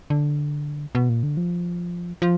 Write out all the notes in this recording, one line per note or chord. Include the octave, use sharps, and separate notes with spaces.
D3
B2
A#2
D3
F3
F3